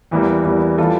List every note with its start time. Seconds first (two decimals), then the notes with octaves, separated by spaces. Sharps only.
0.11 E2 E3 G3 A#3
0.45 E2 E3 G3 A#3
0.78 E3 G3 D4 F4 A4